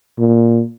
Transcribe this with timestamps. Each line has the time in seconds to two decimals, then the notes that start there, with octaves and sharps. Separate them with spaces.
0.19 A#2